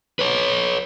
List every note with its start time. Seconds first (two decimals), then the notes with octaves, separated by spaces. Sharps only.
0.19 B4 C#5